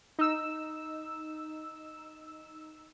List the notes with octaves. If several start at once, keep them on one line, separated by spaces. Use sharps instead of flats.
D#4 E6